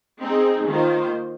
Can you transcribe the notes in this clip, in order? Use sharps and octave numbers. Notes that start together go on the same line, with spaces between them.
C4 D#4 G#4
D#3 A#3 F4 C5